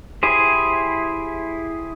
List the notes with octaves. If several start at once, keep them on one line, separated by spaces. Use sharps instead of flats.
E4 G4 G#4 C5